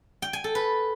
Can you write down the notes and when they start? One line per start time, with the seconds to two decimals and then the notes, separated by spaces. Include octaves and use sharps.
0.22 G5
0.33 G#5
0.44 A4
0.55 B4